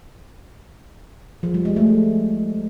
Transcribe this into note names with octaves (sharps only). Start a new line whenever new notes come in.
F3
G3
G#3
A3